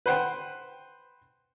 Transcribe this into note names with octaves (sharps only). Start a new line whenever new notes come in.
B4 C5 F#5 G5